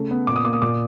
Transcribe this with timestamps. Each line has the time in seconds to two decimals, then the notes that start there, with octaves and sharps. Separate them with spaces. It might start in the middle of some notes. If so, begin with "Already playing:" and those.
Already playing: C#3 A3
0.11 B3
0.27 A#2 D6
0.36 D#6
0.45 A#3 D6
0.53 D#6
0.62 A#2 D6